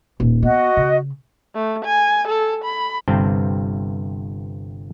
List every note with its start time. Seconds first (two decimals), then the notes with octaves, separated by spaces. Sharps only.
0.20 D#1
0.43 B3 F#4 D#5
0.77 C#3
1.55 A3
1.85 G#5
2.28 A4
2.65 B5
3.08 G1 G2 C3 C4 G5 A5